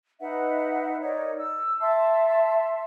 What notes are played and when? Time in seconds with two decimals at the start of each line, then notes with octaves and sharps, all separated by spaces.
0.20 D#4 B4 E5 F#5
1.02 D#4 A#4 C#5 D5
1.38 E6
1.81 E5 A5 C6